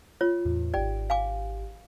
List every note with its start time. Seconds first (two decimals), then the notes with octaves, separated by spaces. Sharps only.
0.21 F4 C#5
0.45 E2 A2
0.74 G#1 G4 D5 G5
1.10 F5 G#5 D6